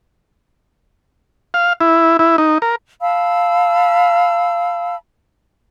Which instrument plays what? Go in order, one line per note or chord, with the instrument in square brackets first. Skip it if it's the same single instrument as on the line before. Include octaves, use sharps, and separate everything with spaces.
[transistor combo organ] F5
E4
E4
D#4
A#4
[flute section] F5 A5 B5 E6